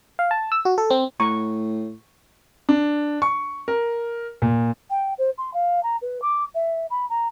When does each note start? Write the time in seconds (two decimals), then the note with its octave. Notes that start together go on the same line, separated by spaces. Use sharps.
0.19 F5
0.31 A5
0.52 E6
0.65 F#4
0.78 A4
0.90 C4
1.20 A2 A#5 C#6
2.69 D4
3.22 C#6
3.68 A#4
4.42 A#2
4.90 G5
5.18 C5
5.38 C6
5.54 F5
5.83 A#5
6.02 B4
6.22 D6
6.55 E5
6.90 B5
7.10 A#5